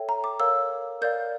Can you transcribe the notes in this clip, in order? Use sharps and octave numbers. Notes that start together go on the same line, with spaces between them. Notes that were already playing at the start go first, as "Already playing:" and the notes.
Already playing: A4 C#5 E5 G5
A#5
D6
A#4 C#5 F5 E6
A#4 D5 F5 G6